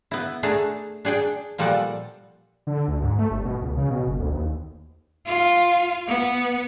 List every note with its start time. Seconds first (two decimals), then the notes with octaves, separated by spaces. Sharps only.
0.11 B3 E4
0.43 A3 D4 G#4 A5 A#5
1.05 D4 G#4 D5 G5
1.58 A#2 F3 G3 A4 D5 F#5
2.67 D3
2.88 D2
3.03 G#2
3.18 A3
3.31 G1
3.45 B2
3.62 C#2
3.77 C#3
3.90 B2
4.07 F#1
4.19 D2
4.32 D#2
5.26 F4
6.08 B3